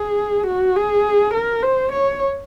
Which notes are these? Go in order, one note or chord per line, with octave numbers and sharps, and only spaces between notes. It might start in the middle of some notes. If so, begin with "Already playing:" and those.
Already playing: G#4
F#4
G#4
A#4
C5
C#5